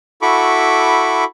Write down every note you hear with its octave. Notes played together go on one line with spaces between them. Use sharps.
E4 F#4 A4 B5 C#6 D6